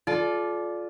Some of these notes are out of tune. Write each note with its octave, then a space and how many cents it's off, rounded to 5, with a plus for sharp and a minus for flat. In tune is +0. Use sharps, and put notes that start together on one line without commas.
F4 +5 A4 -40 D5 +0